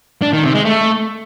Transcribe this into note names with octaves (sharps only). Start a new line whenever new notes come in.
D4
D#3
C3
G#3
A3